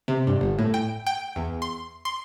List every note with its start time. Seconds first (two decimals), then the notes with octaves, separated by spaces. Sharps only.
0.08 C3
0.27 G2
0.41 G1
0.59 A2
0.74 G5
1.07 G5
1.36 E2
1.62 C6
2.05 C6